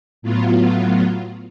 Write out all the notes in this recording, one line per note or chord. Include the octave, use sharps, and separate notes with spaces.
A2 F#3 B3 F4